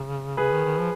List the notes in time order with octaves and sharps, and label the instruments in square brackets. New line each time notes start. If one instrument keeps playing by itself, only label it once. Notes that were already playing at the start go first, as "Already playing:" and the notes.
Already playing: [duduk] C#3
[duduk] C#3 [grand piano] G#4 B4
[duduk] D#3
D#3
F3